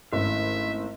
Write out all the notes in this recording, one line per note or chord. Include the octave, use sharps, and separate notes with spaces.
G#1 A3 C#4 E4 E5